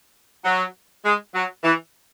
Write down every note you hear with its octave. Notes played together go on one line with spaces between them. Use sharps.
F#3
G#3
F#3
E3